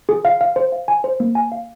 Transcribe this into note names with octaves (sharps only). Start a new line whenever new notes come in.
G#4
F5
F5
C5
F5
G#5
C5
A#3
G#5
F5